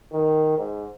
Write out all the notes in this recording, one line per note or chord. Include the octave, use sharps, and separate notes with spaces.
D#3
G#2